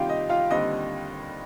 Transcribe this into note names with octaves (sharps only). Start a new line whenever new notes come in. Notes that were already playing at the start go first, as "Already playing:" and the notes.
Already playing: C2 C3 D#3 A#3 F4 G4 F5 G5
D#5
F4 F5
D#2 D3 G3 C4 D#5